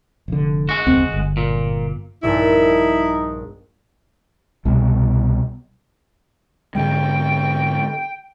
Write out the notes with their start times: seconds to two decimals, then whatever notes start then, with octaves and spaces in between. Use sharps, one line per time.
0.28 F1 D3
0.69 G#3 F#4
0.87 F#1 D#2 C4
1.12 G1
1.37 A#2
2.23 A#1 G2 A#2 D#4 E4
4.65 C2 B2 G3
6.75 G#2 D3 G#3 G5